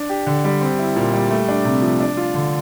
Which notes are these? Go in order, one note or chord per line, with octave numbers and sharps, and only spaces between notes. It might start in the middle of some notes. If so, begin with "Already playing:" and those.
Already playing: D4
G4
D3
G3
C4
E4
A#2
G3
A3
D4
C3
F3
D4
F4
D3